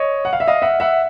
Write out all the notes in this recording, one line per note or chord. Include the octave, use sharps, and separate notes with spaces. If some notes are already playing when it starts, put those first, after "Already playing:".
Already playing: C#5 D#5
F#5
F5
E5
D#5 F5
E5 F#5
E5 F#5